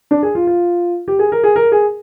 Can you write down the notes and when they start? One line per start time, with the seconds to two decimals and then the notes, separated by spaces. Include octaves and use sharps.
0.11 D4
0.23 G#4
0.35 F4
0.47 F4
1.08 G4
1.19 G#4
1.32 A#4
1.44 G#4
1.56 A#4
1.72 G#4